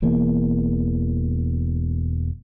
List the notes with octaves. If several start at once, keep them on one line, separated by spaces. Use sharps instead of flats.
E1 E2 A#3